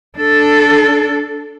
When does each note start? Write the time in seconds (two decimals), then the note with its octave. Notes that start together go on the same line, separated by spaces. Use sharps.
0.18 D4 A4